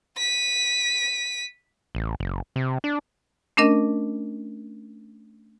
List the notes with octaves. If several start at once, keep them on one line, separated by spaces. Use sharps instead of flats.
B6 D#7
A1
F#1
C3
D4
A3 C#4 D4 A#4 D#5